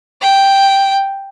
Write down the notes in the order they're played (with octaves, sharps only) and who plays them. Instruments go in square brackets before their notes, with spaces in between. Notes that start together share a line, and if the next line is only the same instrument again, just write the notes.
[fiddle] G5